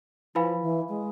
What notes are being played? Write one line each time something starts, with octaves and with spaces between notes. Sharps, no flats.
F3 E4 B4 F5 G#5 B5
E3
G#3